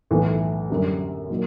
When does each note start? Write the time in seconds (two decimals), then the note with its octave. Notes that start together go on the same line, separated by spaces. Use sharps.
0.11 B1 A2 E3
0.70 F#2 D3 G3
1.30 A#2 F#3 A#3 D#4